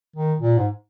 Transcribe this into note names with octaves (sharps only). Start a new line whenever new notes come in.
D#3
A#2
G#2